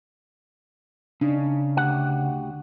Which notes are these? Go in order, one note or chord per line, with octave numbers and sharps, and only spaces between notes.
C#3 D4 D#4
D2 G4 F#5